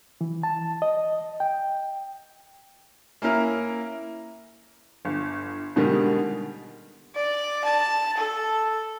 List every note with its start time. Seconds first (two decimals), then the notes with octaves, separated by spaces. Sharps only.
0.21 E3
0.43 A5
0.82 D#5
1.40 G5
3.22 A#3 C#4 E4 A#4
5.05 G1
5.76 B2 D3 D#3 G3 G#3
7.15 D5
7.64 A5
8.17 A4